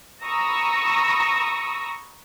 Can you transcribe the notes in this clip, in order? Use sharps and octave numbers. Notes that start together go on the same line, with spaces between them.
A#5 B5 C#6 D#6 E6 A#6